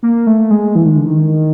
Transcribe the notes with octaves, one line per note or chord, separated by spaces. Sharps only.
A#3
A3
G#3
E3
D#3
D3
D#3